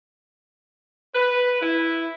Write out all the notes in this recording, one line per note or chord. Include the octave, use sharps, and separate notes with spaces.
B4
E4